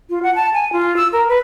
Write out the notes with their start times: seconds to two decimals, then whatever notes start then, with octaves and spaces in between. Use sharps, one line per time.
0.10 F4
0.23 F#5
0.35 A5
0.53 G#5
0.73 F4
0.97 E6
1.13 A#4
1.29 B4